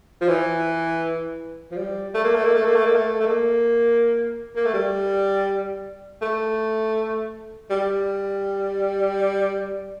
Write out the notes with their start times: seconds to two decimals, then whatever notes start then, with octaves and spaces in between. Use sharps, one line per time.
0.21 F3
0.28 E3
1.71 F3
1.76 G3
2.14 A3
2.24 A#3
2.34 A3
2.44 A#3
2.55 A3
2.65 A#3
2.75 A3
2.85 A#3
2.95 A3
3.20 A3
3.25 A#3
4.55 A#3
4.65 A3
4.74 G3
6.21 A3
7.70 G3